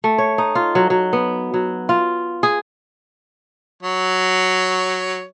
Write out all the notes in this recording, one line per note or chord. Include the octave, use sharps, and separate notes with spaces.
A3
C#5
D#4
F4
F#3
F#3
B3
F#3
F4
G#4
F#3 C#5